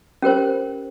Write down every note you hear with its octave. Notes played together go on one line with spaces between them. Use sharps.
C#4 G4 A#4 C5